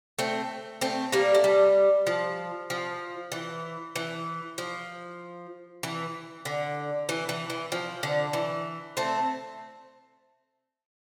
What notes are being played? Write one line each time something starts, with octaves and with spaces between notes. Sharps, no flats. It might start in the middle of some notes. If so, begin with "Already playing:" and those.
A3 C4
A3 C4
G3 A#3
A3
G3
F3
F3
E3
E3
F3
E3
D3
E3
E3
E3
F3
D3
E3
A3 C4